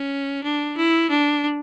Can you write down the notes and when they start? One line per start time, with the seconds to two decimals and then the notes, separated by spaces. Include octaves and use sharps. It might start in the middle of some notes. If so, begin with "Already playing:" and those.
Already playing: C#4
0.43 D4
0.77 E4
1.10 D4